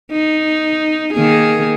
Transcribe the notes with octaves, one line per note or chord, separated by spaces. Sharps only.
D#4
D#3 A#3 G#4